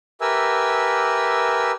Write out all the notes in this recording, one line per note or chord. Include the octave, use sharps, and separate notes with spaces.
G4 A#4 B4 E5 G#5 E6